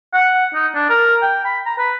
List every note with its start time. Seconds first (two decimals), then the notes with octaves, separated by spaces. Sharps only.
0.13 F#5
0.55 D#4
0.75 D4
0.89 A#4
1.22 G5
1.45 B5
1.66 A#5
1.79 B4